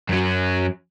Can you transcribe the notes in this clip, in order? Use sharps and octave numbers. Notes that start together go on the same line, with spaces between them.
F#2 F#3